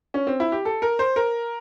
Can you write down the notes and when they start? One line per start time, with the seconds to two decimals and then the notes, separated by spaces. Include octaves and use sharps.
0.14 C#4
0.27 C4
0.40 E4
0.52 G4
0.65 A4
0.82 A#4
0.99 C5
1.16 A#4